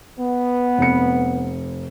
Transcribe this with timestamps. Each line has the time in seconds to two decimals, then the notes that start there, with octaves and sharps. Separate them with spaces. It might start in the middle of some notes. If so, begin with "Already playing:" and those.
0.20 B3
0.78 F1 C#7